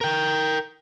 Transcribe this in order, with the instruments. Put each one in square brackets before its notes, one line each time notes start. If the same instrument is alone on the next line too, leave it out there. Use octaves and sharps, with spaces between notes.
[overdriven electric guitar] A#4 G5